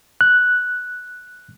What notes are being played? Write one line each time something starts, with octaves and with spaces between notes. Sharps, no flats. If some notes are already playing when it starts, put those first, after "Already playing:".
F#6